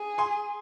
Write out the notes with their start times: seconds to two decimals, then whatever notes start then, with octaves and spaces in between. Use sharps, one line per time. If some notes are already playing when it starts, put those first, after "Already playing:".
Already playing: G#4
0.18 G#5 C6